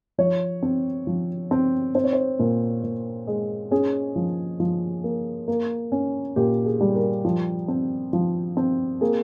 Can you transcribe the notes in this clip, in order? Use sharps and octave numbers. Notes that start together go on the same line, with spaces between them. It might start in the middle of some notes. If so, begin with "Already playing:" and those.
F3 C#5
C4
F3
C4
C4 C5
C#5
C5
A#2
A#2
G#3
C#4 G#4
F3
F3
A#3
A#3
C#4
A#2 G4
G#4
G3
A#4
F3
C4
F3
C4
A#3 G#4